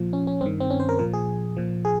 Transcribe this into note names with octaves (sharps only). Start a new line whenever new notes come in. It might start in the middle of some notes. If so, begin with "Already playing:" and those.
Already playing: A#2 F3
C#4
C#4
G2 D#3 C4
C4
C#4
C5
A#4
A#2 F3 A#4
G#4
A#2 F3
G#4